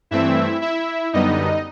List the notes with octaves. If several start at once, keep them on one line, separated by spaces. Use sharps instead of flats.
G2 E3 A3 C4 E4 E5
E4 E5
F#2 D3 G3 B3 D#4 D#5